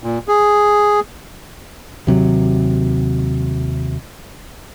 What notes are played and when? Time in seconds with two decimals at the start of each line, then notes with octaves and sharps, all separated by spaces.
0.03 A#2
0.28 G#4
2.07 D#2 C3 F#3